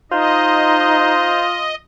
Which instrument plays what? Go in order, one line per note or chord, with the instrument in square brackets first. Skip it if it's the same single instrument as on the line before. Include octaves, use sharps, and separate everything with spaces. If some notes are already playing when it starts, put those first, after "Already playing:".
[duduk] D#4 [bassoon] F4 [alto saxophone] C5 [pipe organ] D#5